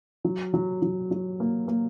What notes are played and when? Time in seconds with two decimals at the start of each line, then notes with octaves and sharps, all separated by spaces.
0.24 F#3
0.54 F#3
0.82 F#3
1.11 F#3
1.40 A#3
1.68 A#3